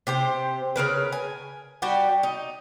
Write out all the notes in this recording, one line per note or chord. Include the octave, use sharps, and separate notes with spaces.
C3 G4 C5
C#3 F3 A#4 B4
G#5
G3 F#4 G4
D#4